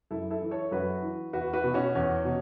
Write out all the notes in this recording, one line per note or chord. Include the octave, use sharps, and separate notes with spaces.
F#2 E4 A4
E4 A4
E3
A4 C#5
F#2 F#4 B4
E3
E2 F#4 B4
F#4 B4
B2
C#4 F#4
E2 C#4
B2